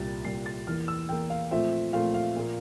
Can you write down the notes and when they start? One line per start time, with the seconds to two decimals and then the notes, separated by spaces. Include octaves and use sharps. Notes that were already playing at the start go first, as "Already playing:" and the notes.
Already playing: C2 A#2 G3 A6
0.25 C2 A#2 G3 C7
0.46 A6
0.67 E2 E3 A#3 F6
0.88 E6
1.09 E2 E3 A#3 G5
1.30 F5
1.51 A#2 F3 A3 C4 E5
1.93 A#2 F3 A3 C4 F5
2.14 F5
2.36 A#2 F3 A#3